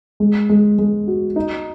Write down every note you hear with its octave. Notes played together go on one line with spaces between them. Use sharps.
G#3
G#3
G#3
F#4
D#4